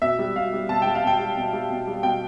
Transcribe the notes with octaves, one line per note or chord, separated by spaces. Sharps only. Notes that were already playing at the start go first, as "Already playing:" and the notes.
B2 E5
G3
B2 F5
G3
B2 A5
G3 G5
F5
B2 G5
G3
B2
G3
B2
G3
B2 G5